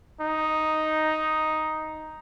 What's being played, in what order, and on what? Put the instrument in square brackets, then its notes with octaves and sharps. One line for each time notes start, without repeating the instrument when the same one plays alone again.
[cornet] D#4